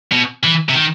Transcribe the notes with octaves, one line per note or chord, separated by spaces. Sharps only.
B2
E3
C3
D#3